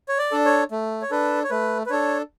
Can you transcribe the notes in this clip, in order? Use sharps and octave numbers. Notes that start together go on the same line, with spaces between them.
C#5
D5
D4 A4
C#5
A3
C#5
D4 A4 B4
C#5
A3 B4
B4
D4 A4 C#5